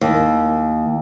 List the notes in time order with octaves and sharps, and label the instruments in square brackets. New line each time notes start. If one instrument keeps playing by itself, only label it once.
[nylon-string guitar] D#2